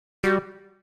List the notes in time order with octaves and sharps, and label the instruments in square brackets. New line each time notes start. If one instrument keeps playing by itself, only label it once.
[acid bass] G3 [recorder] F#4